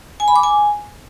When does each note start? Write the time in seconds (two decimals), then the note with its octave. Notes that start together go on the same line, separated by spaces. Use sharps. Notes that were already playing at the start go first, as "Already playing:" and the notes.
0.20 G#5
0.28 B5
0.36 D6
0.43 G#5